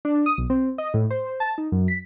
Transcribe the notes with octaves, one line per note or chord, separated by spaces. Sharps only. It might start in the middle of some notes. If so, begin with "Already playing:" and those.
D4
D#6
B1
C4
D#5
A2
C5
A5
D#4
F#2
B6